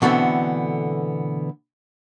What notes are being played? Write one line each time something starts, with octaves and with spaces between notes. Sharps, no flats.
B2 D3 E3 A3 B3 C4